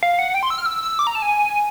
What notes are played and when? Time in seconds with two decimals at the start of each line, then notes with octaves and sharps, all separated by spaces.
0.03 F5
0.19 F#5
0.34 G5
0.43 C6
0.50 E6
0.58 F6
0.66 E6
0.83 E6
0.99 D6
1.07 A#5
1.15 A5
1.22 G#5